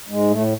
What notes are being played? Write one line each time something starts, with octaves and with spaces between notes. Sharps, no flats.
G#2 G#3
A2 A3